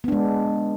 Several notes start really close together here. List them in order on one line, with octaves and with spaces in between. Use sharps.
B3 D4 G#3